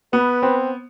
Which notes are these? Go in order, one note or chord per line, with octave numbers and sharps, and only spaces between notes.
B3 B4
C4